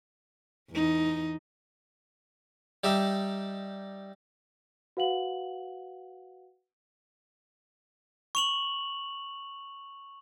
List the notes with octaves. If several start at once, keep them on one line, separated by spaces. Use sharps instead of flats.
E2 D#4
G3 D#4 G4 E5
F#4 B4 F5 F#5 F#7
C#6 F7 F#7